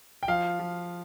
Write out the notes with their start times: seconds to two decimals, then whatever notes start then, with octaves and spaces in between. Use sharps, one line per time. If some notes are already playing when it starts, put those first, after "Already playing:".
0.23 G5
0.28 F3 F5
0.60 F3